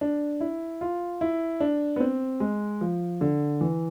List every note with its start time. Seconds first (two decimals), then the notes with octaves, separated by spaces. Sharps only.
0.01 D4
0.41 E4
0.81 F4
1.21 E4
1.60 D4
1.96 B3
2.00 C4
2.40 G#3
2.81 F3
3.21 D3
3.61 E3